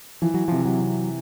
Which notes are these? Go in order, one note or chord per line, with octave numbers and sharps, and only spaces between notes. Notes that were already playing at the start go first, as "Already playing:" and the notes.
E3 F3
F#3
C3 F3
F#3
C3